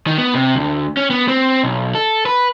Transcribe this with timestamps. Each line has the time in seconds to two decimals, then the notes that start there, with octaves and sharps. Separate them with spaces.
0.07 D#3
0.18 B3
0.35 C3
0.56 D2
0.97 C#4
1.10 B3
1.28 C4
1.63 B1
1.95 A4
2.26 B4